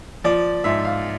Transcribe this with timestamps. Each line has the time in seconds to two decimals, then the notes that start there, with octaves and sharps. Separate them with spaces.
0.24 F3 D5
0.64 G#2 E5
0.85 F5